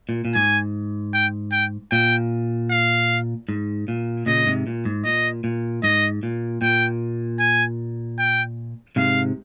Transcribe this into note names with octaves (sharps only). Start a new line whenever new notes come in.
A#2
A#2
G#2 G#5
G5
G5
A#2 G5
F5
G#2
A#2
A#2 C#3 D#5
G#2 C3
A#2
G#2
A#2 D#5
A#2
G#2 D#5
A#2
A#2 G5
G#5
G5
G#2 C3 F5